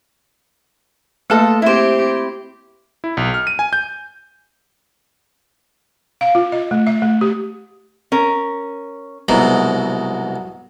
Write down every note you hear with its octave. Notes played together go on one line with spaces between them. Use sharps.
A3 A#3 F4 A4 B4 D#5
C4 E4 G4 C5
E4
B1
F6
D#7
G#5
G6
F5
F4
D#5
A3
E5
A3
G4
C#4 A#4
C2 G#2 B2 F#3